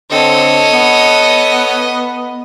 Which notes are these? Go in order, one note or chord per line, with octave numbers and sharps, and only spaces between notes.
D3 C4 A4 C#5 D#5
B3